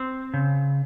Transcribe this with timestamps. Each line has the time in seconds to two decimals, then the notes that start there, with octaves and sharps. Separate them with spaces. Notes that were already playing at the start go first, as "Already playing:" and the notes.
Already playing: C4
0.34 C#3